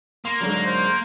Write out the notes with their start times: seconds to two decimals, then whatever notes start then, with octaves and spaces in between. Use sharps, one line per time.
0.25 A#3 C6
0.40 G#2 D3 F#3
0.66 C5